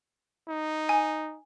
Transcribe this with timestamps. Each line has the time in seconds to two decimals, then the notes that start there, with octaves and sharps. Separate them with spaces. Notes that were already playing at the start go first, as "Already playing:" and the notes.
0.48 D#4
0.89 G#5